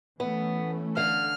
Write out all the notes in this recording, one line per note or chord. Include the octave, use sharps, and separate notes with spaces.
E3 A3 B3 C#4
D3 F5 F6